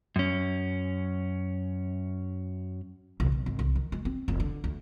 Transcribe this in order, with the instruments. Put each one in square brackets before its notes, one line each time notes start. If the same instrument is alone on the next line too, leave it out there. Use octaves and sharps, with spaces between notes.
[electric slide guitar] F#2 C#4
[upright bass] C2
B1
G#1
C2
D#3
G#3
C4
F1
D3
D2